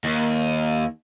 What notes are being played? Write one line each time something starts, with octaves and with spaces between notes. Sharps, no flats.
D#2